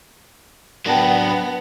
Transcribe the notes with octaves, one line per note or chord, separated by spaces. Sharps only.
F#3 B3 D4 G5 A5 A#6